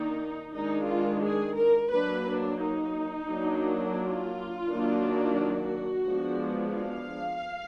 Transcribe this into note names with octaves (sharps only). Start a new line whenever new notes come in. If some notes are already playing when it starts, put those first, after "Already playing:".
Already playing: D#3 A#3 D4 D#4
D#3 G#3 D4 D#4
F4
G#4
A#4
F#3 A#3 D4 B4
D4
D#4
F#3 A#3 D4
F4
D#3 F#3 A#3 D4
F#4
F3 G#3 B3 D4
F5